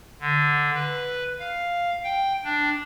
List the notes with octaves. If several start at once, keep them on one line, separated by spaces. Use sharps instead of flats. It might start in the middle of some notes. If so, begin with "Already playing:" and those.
D3
B4
F5
G5
D4